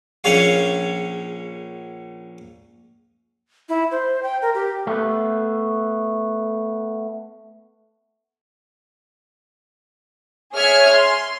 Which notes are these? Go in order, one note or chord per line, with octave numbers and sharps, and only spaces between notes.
A#1 C#4 G#4 C#5 F5
E4
C5
G5
A#4
G4
A3 B3
G#4 C#5 E5 G#5 F6 G#6
C6